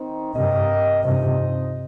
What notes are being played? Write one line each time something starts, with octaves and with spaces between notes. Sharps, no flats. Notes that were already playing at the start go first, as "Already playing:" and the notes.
Already playing: D#3 C4 D#4
G2 C3 A#3 G4 A#4 D#5
G2 C3 F3 D#4 C5 D#5